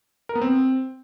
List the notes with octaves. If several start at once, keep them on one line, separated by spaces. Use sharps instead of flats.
A#4
B3
C4